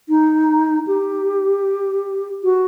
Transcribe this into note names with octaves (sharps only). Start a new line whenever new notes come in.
D#4
G4
F#4